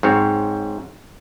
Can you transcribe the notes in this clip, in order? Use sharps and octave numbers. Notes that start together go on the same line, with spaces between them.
G#2 F#3 C4 C#5